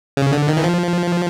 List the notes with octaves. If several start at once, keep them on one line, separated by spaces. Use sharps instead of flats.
C#3
D3
D#3
E3
F3